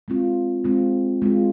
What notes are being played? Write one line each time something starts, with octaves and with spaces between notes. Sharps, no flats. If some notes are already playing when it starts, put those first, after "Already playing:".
G#3 C4 F4
G#3 C4 F4
G#3 C4 F4